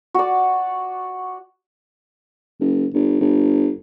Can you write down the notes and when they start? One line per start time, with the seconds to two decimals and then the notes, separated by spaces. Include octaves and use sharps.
0.14 F#4 D5
2.60 F#1
2.94 G1
3.21 G1